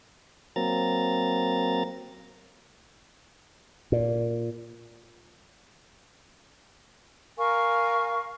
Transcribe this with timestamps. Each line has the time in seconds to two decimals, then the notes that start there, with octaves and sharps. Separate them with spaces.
0.56 F#3 A#3 C4 A#5 A6
3.92 A#2
7.38 A#4 F5 G#5 C#6